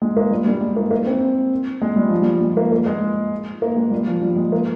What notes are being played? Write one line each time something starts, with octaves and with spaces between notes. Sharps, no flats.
G#3
A#3
G3
G3
G#3
A#3
A#3
C4
G#3
G3
F3
G3
G#3
A#3
A#3
G#3
A#3
G#3
G3
F3
G3
G#3
A#3